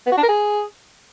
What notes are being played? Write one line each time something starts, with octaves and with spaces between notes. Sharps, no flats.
B3
F#4
D4
A#4
G#4